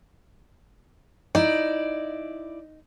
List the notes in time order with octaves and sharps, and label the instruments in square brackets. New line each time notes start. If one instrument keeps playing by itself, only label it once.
[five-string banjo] D#4 [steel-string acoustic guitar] E4 D5